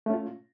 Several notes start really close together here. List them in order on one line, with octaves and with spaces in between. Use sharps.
A3 C#4 F4